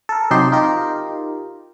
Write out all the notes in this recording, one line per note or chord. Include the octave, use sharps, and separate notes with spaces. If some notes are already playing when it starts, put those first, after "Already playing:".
A4 A#4
C3 F#3 D#4 G4 C5 C6
D#4 F4 G4 A#4